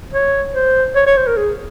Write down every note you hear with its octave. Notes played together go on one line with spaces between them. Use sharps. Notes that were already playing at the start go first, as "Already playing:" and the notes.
C#5
C5
C#5
C#5
C5
A#4
G#4